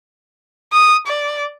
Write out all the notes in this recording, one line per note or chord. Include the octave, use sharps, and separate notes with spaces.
D#6
D5